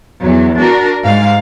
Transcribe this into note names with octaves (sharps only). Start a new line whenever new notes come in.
E2 F#3
D4 F#4 A#4
G#2 F5